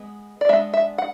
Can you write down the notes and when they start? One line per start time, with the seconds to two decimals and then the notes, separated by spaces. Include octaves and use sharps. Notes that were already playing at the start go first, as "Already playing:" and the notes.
Already playing: G#3 B3
0.41 D5
0.49 G#3 B3 D4 E5
0.74 E5
0.98 F#5